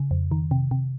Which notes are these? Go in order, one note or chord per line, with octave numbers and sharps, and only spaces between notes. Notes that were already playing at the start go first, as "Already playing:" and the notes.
Already playing: C#3
F2
D#3
C3
C3